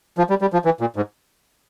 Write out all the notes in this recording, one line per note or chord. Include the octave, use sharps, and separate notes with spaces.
F3
G3
G3
F3
E3
A#2
G#2